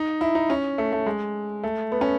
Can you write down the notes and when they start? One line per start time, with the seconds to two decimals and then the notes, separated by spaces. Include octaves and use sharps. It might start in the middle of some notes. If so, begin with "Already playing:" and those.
Already playing: D#4
0.21 E4
0.35 D#4
0.50 C#4
0.78 A3
0.92 A3
1.06 G#3
1.63 A3
1.92 B3
2.01 C#4